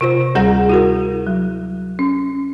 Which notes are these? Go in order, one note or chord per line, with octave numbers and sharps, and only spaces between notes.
C3 F4 C5
D2 G3 G#4 F#5 A#5 A#6
E4 F#4 A#4
F#3
C#4